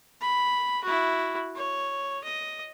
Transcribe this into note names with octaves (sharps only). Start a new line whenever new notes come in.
B5
E4 F#4
C#5
D#5